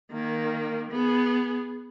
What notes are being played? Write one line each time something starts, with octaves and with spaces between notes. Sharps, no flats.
D#3 A#3
B3 G#4